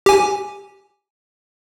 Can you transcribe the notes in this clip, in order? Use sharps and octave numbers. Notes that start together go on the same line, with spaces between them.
G4 G#5